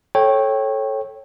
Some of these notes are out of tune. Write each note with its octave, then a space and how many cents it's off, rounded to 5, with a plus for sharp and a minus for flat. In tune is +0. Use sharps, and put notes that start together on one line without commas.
A4 -10 C#5 -20 G5 +0